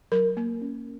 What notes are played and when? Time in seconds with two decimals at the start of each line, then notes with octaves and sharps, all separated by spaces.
0.12 F#3 A#4
0.37 A#3
0.62 C#4